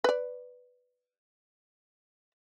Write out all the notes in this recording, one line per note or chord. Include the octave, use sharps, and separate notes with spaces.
B4 D5